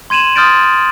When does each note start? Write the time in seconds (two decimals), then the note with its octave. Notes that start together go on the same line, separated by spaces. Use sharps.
0.10 C6 G#6 D#7 E7 F#7
0.36 C6 D#6 F6 G6 A6 D7